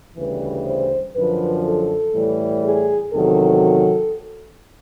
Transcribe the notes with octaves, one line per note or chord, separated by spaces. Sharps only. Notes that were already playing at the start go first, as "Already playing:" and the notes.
D2 C#3 E3 G3 B4
C5
F#2 D3 F3 B4
A4
A2 E3 G3
G#4
E2 C3 D#3 F#3 A4